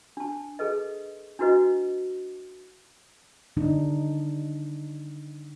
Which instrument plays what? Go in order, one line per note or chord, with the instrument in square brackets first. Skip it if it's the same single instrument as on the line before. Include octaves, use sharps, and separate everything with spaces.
[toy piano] D4 A5
G#4 A4 B4 D#5
D4 E4 F#4 B4 D#5
[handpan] D3 G3 D4 D#4